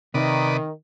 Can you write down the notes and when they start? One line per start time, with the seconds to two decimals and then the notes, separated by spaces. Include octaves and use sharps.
0.14 C3 D#3 B4 D5 D#5